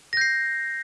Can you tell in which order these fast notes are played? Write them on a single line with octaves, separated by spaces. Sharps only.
A#6 G6 C7